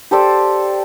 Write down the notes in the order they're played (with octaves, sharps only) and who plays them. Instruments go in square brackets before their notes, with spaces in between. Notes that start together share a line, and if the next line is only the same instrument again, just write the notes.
[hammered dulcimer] G4 A4 C5 D5